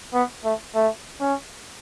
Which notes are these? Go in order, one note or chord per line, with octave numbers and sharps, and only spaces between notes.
B3
A3
A3
C#4